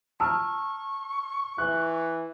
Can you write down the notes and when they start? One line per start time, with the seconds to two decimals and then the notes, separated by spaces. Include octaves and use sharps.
0.20 A5 A#5 C#6 E6 F6
1.58 E3 F#6